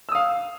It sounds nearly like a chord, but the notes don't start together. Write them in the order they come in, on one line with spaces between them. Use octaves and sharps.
E6 D#6 F5